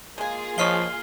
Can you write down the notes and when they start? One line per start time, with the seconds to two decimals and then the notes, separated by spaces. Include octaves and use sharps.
0.18 G#3 A#3 F4 G#4 G#5
0.58 F3 C#5 D#5 F5 F6 C7 G7